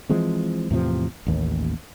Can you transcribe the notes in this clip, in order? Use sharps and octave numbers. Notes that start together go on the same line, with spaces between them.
E3 F3 G#3 C4
E2 A2 C3 F3
A1 D#2